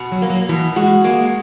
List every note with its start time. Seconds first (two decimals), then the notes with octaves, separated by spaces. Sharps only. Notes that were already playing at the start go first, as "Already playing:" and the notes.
Already playing: B2
0.12 F#3
0.22 A#3
0.30 F#3
0.49 B2 E3
0.76 G#3 F#4
1.04 G#3 A#3